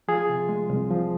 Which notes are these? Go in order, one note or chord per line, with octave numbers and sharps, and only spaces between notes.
F3 F4 G#4
C3
G#3
C2
F3